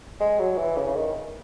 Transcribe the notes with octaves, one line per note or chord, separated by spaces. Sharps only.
G#3
F#3
E3
C#3
C#3
D#3